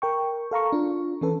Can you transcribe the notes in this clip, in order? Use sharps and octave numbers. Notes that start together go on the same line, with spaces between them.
A#4 G5 C#6
A4 F5 A#5 C#6
D4 F4
E3 C#4 A4 B4